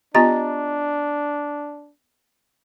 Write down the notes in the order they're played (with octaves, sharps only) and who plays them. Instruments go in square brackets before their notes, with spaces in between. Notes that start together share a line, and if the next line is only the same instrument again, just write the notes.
[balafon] B3 F4 G4 [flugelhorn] D4 [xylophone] D#5 A#5 A6